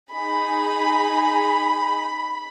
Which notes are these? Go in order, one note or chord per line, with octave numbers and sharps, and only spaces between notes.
D#4 G#4 B5